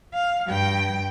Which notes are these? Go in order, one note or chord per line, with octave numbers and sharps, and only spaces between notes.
F5
G2 G5